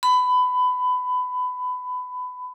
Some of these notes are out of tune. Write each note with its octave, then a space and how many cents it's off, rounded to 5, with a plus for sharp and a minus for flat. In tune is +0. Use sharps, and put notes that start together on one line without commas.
B5 +20